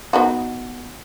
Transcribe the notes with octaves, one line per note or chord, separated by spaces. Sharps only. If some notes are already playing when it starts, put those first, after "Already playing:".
B3 D#4 F#4